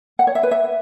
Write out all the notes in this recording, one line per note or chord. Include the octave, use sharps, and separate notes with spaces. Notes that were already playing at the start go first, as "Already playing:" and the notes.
F#5
C#5
E5
B4
E5